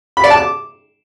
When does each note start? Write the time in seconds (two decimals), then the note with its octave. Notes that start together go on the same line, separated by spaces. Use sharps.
0.17 B5
0.24 D5
0.30 A5
0.37 D6